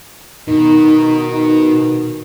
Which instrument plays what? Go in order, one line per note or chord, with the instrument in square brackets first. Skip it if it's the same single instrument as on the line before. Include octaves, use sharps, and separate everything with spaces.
[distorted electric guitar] B2 [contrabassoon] D#3 [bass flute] D#4